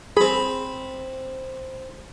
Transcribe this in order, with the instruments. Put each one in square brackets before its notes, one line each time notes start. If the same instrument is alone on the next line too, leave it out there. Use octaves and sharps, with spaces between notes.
[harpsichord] C4 B5 [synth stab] G#4